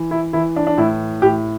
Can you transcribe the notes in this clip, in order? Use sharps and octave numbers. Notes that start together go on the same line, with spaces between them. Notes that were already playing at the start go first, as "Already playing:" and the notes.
Already playing: E3
E4
E3 E4
D4
D4
A2 E4
A2 G4